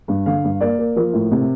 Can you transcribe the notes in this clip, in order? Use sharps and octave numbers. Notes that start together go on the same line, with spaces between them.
G2
D3 F5
G2
A#3 D5
A#3
F3 A#4
A2
C3